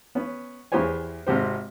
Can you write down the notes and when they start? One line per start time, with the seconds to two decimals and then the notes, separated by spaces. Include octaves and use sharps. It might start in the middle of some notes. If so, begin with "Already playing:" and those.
0.15 B3 C#4
0.72 E2 E3 G4 C5 C#5 G#5
1.27 G#1 C3 G4 C5